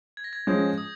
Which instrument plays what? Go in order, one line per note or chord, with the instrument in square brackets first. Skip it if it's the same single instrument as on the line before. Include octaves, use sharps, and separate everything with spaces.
[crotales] G#6
A#6
G#6
[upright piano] F3 G#3 C#4 G#4 [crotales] G6
[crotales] D#6